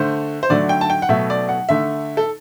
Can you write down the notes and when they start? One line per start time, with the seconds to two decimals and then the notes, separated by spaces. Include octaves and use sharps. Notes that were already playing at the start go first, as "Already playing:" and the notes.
Already playing: D3 A3 C5
0.43 C5
0.50 D3 F#3 A3 D5
0.69 G5
0.81 A5
0.90 G5
1.02 F#5
1.09 B2 F#3 A3 E5
1.30 D5
1.49 F#5
1.69 D3 A3 E5
2.17 A4